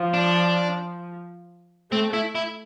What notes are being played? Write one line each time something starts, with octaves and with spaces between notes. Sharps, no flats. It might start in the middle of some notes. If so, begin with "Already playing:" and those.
Already playing: F3
D4
A3 C4
E4
E4